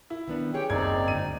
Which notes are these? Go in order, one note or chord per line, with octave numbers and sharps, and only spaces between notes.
E4
D#3 B3 D4
C#4 G4 G#4 C#5 G5
F#1 C4 D#4 D5 G#6
D2 G#2 D#7